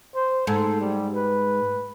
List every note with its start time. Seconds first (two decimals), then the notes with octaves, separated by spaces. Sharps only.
0.15 C5
0.47 G#2 A4
0.80 G3
1.15 B4